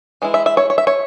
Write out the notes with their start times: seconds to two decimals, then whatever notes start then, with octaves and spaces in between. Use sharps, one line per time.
0.22 E3 G#3 E4
0.34 E5
0.46 E5
0.57 C#5
0.70 C#5
0.78 E5
0.87 C#5